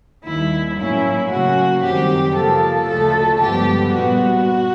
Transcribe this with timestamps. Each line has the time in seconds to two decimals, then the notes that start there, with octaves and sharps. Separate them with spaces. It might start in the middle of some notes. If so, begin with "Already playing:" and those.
0.24 D#2 D#3 G3 E4
0.77 A2 F#3 A#3 C#4 E4
1.29 C#3 F#3 A#3 C#4 F#4
1.82 F#2 D#3 G3 C4 G4
2.35 C#3 F3 A#3 A4
2.87 D2 C#3 F3 A3 A4
3.40 G2 D3 F3 G#3 B3 G4
3.93 A#2 G3 B3 F#4